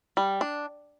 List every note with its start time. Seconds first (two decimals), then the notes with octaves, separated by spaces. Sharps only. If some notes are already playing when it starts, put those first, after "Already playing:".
0.17 G3
0.41 D4